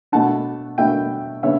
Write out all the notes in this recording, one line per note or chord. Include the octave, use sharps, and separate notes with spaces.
B2 A3 D4 F#5 A5
B2 A3 D4 E5 G5
C#3 B3 D4 C#5 E5